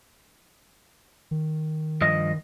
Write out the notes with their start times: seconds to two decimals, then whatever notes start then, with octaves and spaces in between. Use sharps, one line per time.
1.31 D#3
2.01 G2 F3 D#5